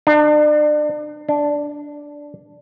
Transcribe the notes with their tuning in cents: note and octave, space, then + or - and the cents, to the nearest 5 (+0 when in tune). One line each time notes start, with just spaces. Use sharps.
D4 +35
D4 -5